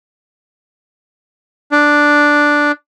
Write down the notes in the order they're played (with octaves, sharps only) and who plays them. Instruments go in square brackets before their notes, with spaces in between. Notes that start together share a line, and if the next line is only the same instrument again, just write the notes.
[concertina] D4